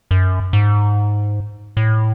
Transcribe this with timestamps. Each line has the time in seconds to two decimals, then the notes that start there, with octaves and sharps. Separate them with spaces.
0.11 F#2
0.53 G#2
1.77 A2